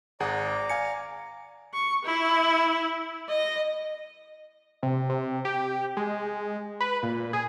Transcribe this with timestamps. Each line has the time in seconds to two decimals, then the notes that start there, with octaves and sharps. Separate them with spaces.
0.20 G#1 G#4 D5 F#5 A#5 D6
0.70 F5 G#5 C#7
1.74 C#6
2.05 E4
3.29 D#5
4.83 C3
5.09 C3
5.45 G4
5.97 G#3
6.80 B4
7.03 A#2
7.33 G#4